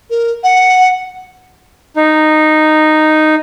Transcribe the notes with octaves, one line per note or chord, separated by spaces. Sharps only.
A#4
F#5
D#4